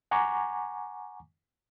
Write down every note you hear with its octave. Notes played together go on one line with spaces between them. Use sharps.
F#5 G#5 A#5 C#6 D6